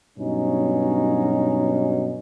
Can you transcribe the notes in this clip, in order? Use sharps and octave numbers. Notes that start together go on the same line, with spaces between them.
G2 B2 F#3 C#4 D#4